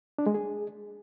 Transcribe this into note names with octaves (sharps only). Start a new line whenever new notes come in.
D4
G#3
G#4